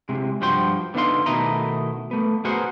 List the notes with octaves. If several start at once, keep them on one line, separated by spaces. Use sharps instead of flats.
C3 G#3
G2 F3 F#4 G5 C6
D3 B3 D#4 F5 C6
B2 D#3 A3 E4 D#5 A#5
A3 B3
B3 F#4 G#4 A#4 C5 F#5